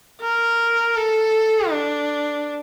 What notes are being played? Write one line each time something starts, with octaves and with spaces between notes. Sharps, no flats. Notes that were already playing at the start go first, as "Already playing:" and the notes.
A#4
A4
D4